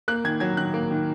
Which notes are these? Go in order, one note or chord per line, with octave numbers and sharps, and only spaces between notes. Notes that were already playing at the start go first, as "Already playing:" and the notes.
A#3 F#6
D#3 G#6
F#3 G#6
D#3 F#6
A#3
D#3